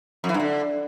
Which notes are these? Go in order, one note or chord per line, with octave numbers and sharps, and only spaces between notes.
F2
E3
G2
D3